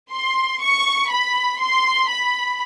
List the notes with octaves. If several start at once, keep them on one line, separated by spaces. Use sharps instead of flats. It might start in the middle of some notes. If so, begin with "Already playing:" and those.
C6
C#6
B5
C6
B5